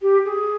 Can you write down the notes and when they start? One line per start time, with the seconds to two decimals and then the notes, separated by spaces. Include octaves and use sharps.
0.02 G4
0.25 G#4